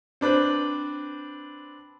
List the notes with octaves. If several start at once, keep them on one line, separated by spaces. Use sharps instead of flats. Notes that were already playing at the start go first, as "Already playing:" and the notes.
C4 D4 B4 C5